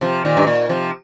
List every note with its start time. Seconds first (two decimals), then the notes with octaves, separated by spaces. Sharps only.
0.01 C3 F3
0.25 A#2 D#3
0.37 G2
0.47 A#2
0.69 C3 F3